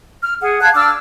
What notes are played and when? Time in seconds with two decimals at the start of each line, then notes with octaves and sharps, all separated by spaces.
0.23 F6
0.41 G#4 F#5
0.61 F5 A5 F#6 G#6
0.74 D4 D6 E6 F6